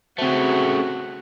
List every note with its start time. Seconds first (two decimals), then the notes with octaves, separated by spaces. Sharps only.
0.18 C#3 A3 C4 F#4 C5